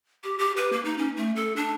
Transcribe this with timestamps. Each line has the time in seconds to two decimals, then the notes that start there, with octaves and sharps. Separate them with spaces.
0.23 G4
0.38 G4
0.57 B4
0.72 A#3
0.85 D#4
0.98 C#4
1.17 A3
1.36 A4
1.56 D4